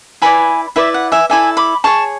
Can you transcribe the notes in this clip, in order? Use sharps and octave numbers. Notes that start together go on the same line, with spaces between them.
E4 B4 D5 G#5 B5
E4 B4 D5 E5
F#5
E5 G#5
E4 A4 D5 E5 G#5
B5 D6
G#4 C#5 A5 C#6